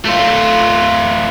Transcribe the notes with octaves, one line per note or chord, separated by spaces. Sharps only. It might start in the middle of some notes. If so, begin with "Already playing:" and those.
A3 F4